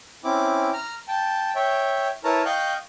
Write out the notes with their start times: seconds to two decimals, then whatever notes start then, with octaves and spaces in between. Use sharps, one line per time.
0.24 C4 C#4 E4 D6
0.73 A#5 F6
1.08 G5 A5
1.55 C#5 E5 G5
2.24 E4 A#4 B4 C#5 A5 A#5
2.45 D#5 F5 G5 C#6 F#6 G6